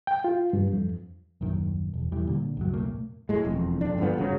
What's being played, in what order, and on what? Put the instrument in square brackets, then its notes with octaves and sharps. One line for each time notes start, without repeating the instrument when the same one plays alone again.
[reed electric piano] G5
F4
G2
F2
[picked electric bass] D#1 A#1 F#2 D#3
E1
E2 E3 G3
A#2 D3
C#2 G2 F#3
F1 A#2 A3 A#3
[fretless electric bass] A2 G#3
E1 F2
F2 D4
G2 D3 F3 B3
F#1 G#2 C#3 F#3